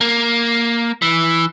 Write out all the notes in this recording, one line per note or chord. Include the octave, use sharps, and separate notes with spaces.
A#3
E3